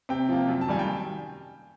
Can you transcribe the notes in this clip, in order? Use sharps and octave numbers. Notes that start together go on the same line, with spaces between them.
C3 G5
F3 A#3
F#2
A5
D#3 G3 G#5
G5